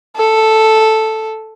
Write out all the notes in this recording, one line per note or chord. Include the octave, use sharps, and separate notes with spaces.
A4